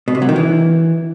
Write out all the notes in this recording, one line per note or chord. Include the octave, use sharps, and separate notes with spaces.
B2
C3
F#3
D#3
E3